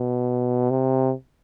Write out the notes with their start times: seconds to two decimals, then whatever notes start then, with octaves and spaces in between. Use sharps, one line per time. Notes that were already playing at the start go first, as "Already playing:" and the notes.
Already playing: B2
0.71 C3